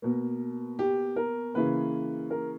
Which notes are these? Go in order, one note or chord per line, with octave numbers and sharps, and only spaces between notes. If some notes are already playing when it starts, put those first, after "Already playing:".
B2 A#3
G4
A#4
C#3 E3 A#3 B4
A#4